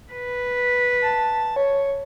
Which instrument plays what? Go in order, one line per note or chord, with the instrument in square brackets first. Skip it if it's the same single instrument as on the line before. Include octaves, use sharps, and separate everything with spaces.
[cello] B4
[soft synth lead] A5
C#5